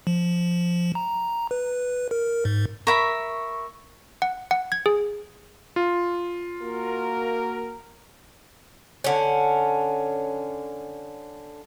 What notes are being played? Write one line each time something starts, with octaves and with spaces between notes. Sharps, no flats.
F3
A#5
B4
A#4
G#2
A#4 E5 B5 C#6
F#5
F#5
G#6
G#4
F4
A#3 F#4 A#4
D3 C#4